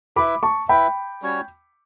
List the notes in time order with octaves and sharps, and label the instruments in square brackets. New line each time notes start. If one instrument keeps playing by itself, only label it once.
[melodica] E4 B4 E5 [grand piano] B5 D6
[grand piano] A5 C#6
[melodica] E4 B4 E5 [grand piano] G5 B5
[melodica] G3 C#4 F#4 C#5